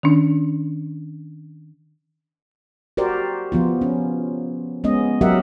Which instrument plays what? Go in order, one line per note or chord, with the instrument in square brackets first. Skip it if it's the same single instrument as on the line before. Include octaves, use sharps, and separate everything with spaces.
[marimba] D#3 C#4 D4
[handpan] F#4 G4 A#4 C5 D5
F3 B3 F4
C#4
G#3 B3 C#4 D#5
F#3 G4 A#4 D#5 E5 F#5